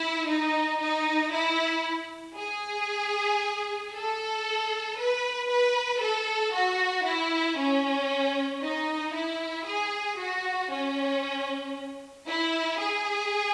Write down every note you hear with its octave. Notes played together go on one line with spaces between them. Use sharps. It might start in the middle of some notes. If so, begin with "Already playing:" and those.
Already playing: E4
D#4
D#4
E4
G#4
A4
B4
B4
A4
F#4
E4
C#4
D#4
E4
G#4
F#4
C#4
E4
G#4